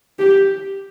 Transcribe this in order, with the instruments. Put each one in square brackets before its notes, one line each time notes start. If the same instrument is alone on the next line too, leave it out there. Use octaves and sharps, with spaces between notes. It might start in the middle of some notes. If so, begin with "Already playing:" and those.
[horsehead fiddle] G4